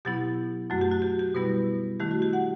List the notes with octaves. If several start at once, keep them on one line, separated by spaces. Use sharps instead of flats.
B2 F#3 B3 E4 G4
F#2 F#3 A3 F#4
G4
F#4
G4
G4
B2 G3 B3 E4 B4
D#3 A3 E4 G4
F#4
G4
F#5